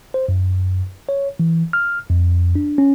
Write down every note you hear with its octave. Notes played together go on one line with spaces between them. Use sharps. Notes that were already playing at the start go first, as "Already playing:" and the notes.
C5
F#2
C#5
E3
F6
F2
D4
C#4